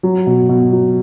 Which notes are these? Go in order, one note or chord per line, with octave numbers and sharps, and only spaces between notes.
F#3
B2
B2
F#3